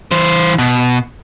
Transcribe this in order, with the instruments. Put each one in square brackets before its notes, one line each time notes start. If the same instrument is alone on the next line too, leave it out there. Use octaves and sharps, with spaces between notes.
[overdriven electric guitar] E3 C5
B2